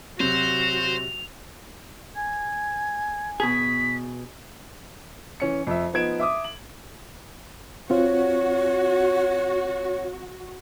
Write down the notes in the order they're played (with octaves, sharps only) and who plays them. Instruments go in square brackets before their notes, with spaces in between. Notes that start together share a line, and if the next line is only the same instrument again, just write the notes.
[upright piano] C3 F#3 [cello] F#4 [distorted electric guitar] C5 [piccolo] F7
[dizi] G#5 [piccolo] G#6
[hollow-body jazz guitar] B2 G#4 [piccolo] B6
[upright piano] E3 C#4 C#7
F2 E5
F3 B3 D#4 G#6 D7 E7
E5 D6 D#6
F#7
[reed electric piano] C4 F4 [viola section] F#4 [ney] C#5